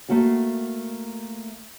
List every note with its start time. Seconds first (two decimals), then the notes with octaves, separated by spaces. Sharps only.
0.09 A3 A#3 F#4 F5